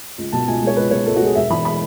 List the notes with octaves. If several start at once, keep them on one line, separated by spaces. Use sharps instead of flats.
C#2
B2 A5
C#2 G#5
G#3 C#5
C#2 B4
B2 C#5
C#2 A4
F#4
G#3 G#4
E1 E5
E2 B5
B5